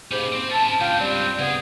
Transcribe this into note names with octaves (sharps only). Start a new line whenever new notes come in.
G#2 A#3 C#4 G4 B5
C4
C#4 E4 A5
C#2 D4 F4 F5 G5
G3 C4
C#3 B3 G#4